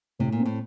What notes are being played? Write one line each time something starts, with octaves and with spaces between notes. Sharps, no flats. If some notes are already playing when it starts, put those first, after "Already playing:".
A2 C3
A#2
C4
A2